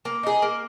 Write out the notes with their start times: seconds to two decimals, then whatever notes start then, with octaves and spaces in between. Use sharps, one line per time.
0.05 A#3
0.23 D#4 G#4
0.42 A#3